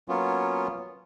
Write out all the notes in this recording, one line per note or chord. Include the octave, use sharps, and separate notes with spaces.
F#3 A#3 B3 C#4 F4